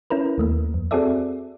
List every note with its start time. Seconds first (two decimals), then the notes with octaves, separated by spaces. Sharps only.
0.10 C#4 E4 A#4 B4
0.38 D#2 A3 A#3
0.74 F2
0.91 C4 F#4 G#4 A4 D5 E5